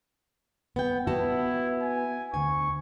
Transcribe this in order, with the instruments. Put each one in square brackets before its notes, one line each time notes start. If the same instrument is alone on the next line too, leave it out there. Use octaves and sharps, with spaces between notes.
[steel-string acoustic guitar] B3 G5
[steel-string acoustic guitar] B3 F#4 A5 [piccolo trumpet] E4
[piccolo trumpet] G#5
[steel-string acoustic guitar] D2 G#5 [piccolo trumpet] C#6